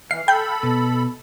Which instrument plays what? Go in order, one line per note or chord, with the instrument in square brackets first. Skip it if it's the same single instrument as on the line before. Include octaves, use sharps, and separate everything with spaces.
[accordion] E3 [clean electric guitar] F5 [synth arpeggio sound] C7
[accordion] A4 B5 [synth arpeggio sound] G5 G6
[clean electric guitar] B2